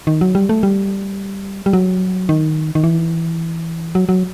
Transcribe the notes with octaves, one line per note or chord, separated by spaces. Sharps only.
D#3
F#3
G3
A3
G3
G3
F#3
D#3
D#3
E3
F#3
F#3